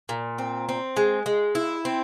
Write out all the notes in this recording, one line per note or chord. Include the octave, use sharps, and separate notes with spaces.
A#2
C4
C4
G#3
G#3
E4
C4